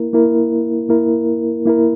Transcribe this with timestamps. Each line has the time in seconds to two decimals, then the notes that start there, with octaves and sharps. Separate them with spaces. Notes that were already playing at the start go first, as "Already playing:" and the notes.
Already playing: A#3 E4 A#4
0.13 A#3 E4 A#4
0.89 A#3 E4 A#4
1.65 A#3 E4 A#4